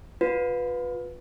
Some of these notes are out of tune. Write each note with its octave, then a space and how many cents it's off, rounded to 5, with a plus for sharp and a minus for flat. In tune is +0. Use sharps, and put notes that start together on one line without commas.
F4 +35 B4 +0